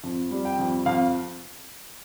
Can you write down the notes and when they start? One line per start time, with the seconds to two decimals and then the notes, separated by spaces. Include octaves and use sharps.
0.03 F2
0.31 G3
0.45 G5
0.59 F2
0.86 F2 F5